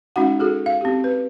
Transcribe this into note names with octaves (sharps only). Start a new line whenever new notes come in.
G#3 C#4 D#4 F#4 F#5
F#4 G#4 A4
F5
C4 G4
B4